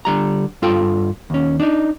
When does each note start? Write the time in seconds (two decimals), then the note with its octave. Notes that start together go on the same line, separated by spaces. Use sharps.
0.05 D3 G3 A#5
0.62 G2 F4 A4 G5
1.30 D#2 C#4
1.60 D4 D#4